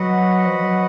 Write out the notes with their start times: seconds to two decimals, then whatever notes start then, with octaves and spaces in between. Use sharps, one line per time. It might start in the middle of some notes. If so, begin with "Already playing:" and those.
Already playing: F#3 F#4 B4 D#5 F#5
0.46 F3
0.58 F3
0.63 F#3